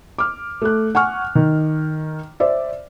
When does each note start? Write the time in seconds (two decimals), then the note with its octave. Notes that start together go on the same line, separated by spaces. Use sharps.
0.18 D6 F6
0.62 A3 F#6
0.95 F#5 G#5 C#6 F6
1.35 D#3
2.40 C5 D5 E5